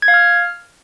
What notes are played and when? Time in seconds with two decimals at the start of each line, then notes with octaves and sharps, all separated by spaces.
0.02 G#6
0.08 F5
0.14 F6